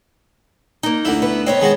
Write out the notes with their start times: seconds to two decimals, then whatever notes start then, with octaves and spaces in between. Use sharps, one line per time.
0.83 A#3 D#4
1.05 D2 D3 E4
1.22 B3 B4
1.46 B3 C4 C#5 D#5
1.60 D#3 G#3 F#4